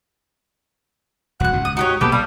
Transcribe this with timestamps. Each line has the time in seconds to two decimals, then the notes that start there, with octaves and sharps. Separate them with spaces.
1.40 D#1 B1 F#4 F#5 F#6
1.53 C#2 G#2
1.65 D#6
1.77 D#4 F#4 G4 C#5
2.01 A#1 B2 A#3 G4 A4 B4
2.12 G3 F5